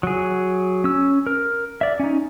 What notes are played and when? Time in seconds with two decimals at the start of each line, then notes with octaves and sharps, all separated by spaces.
0.03 F#3 G#4
0.84 C#4 E6
1.27 A#4
1.81 D5 E5
2.00 C#4 D#4